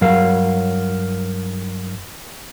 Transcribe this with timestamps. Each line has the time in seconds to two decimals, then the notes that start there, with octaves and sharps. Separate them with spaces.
0.01 G2 F#3 A#4 F5